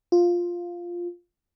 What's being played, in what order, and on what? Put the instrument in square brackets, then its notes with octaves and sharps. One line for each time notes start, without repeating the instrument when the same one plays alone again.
[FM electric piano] F4